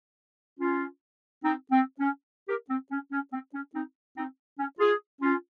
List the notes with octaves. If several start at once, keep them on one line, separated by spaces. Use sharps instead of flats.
C#4 F4
C4 D#4
C4
C#4
G4 A#4
C4
C#4
C#4
C4
C#4
C4 D#4
C4 D#4
C#4
F4 G#4
C#4 F4